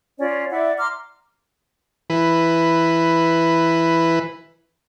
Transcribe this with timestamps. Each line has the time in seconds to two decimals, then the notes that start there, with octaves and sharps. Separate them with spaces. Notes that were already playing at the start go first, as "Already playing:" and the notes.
0.19 C#4 F4 C#5 D5
0.51 E4 D5 E5 F#5
0.77 A#5 C6 D6 F6
2.10 E3 B4